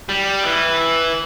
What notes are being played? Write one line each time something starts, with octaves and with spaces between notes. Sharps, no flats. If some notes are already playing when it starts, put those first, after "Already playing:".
G3
E3